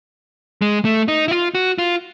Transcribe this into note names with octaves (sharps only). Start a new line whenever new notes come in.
G#3
A3
D#4
E4
F4
F#4
F4